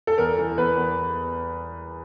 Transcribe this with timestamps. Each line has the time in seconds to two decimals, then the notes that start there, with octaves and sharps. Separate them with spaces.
0.07 A4
0.18 E2 A#4
0.38 E3
0.58 E2 B4
0.77 E2